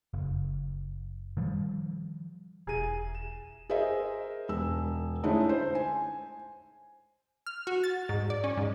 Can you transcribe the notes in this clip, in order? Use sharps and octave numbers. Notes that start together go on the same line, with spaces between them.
F#1
D#3 F3 G3
E1 G#4 D#7
E7
G#4 A#4 C5 D#5 E5
E1 E6
D3 G#3 A3 C#4 D#4 E4
C5
G#5
F6
F#4
A6
G#2
D5
C#4
G#2